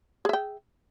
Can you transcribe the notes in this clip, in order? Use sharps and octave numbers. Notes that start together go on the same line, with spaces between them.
G#4 E5 G5